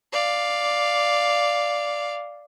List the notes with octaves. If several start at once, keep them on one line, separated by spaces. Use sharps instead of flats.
D5 F5